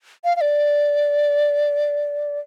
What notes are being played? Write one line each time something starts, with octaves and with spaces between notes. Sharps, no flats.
F5
F5
D5